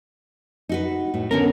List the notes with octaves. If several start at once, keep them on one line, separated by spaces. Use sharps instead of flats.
D#4 F#4 B4
A2
D3 B3 C#4 A#4